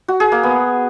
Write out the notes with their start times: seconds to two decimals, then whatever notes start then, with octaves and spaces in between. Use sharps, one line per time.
0.08 F#4
0.20 G#4
0.32 A#3
0.43 B3